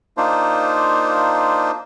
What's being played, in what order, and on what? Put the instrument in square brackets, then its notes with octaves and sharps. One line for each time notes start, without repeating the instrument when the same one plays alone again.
[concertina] A#3 D4 D#4 F4 C5